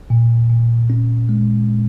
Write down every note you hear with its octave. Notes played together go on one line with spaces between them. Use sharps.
A#2
A#2
C#4
G#3